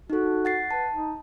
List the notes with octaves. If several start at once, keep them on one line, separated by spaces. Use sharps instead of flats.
D#4 F#4 A4
F#5 A6 C7
B4 A5
D#4